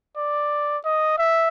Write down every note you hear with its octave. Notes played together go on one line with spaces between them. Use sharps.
D5
D#5
E5